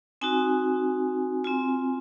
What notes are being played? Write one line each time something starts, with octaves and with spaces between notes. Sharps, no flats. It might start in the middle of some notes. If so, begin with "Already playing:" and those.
C4 D#4 F#4 G#5
C4 F4 G#5